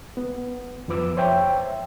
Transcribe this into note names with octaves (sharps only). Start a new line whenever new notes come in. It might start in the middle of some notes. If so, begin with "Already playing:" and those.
B3
F2 F3 B4 D6 E6
C5 C#5 E5 G5